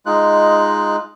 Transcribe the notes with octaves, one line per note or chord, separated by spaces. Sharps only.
G#3 D#4 F4 F#6